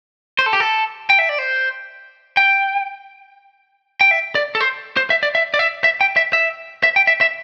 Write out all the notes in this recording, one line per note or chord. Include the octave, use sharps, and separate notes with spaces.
C5
A4
G4
A4
G5
E5
D5
C5
G5
G5
E5
D5
A4
C5
C5
E5
D5
E5
D5
E5
E5
G5
E5
E5
E5
G5
E5
E5